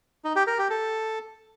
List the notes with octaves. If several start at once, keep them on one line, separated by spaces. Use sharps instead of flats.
D#4
G4
A#4
G4
A4